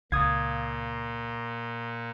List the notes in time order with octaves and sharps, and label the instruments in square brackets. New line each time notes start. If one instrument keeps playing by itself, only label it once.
[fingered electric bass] C#2 [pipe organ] A#2 [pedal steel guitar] F5 D#6 [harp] G#6 A6